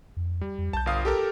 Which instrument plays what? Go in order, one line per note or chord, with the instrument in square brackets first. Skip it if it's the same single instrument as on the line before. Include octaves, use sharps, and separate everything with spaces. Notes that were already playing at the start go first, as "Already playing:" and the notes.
[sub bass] F2
[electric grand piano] G3
[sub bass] F2
[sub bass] B1 [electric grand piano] A5 G6
[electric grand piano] G1 F5 D#6
G4 A4 A#4